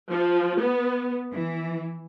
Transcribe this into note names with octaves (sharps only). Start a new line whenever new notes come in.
F3
B3
E3